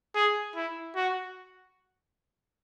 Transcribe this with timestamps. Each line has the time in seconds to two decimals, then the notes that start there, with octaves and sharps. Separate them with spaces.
0.15 G#4
0.55 E4
0.95 F#4